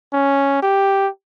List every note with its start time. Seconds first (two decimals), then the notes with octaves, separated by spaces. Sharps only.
0.13 C#4
0.63 G4